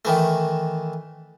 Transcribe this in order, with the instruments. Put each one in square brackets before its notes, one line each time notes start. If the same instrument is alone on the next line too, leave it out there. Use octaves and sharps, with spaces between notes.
[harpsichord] D#3 E3 A3